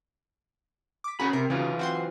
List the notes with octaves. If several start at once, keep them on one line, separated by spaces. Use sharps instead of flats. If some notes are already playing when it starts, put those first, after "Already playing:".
D6 B6
C#4 F#4 G#4 A#4 B5
C3 A#4
C#3 E3 F#3 F4
C4 F#4 C6